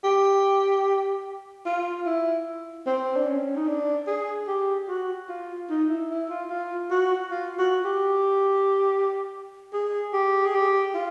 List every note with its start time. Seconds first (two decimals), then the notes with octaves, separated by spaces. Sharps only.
0.04 G4
1.66 F4
2.06 E4
2.86 C4
3.16 D4
3.27 C#4
3.56 D#4
3.68 D4
4.07 G#4
4.48 G4
4.88 F#4
5.29 F4
5.70 D#4
5.89 E4
6.10 E4
6.30 F4
6.50 F4
6.91 F#4
7.31 F4
7.59 F#4
7.85 G4
9.73 G#4
10.13 G4
10.45 G#4
10.55 G4
10.95 F4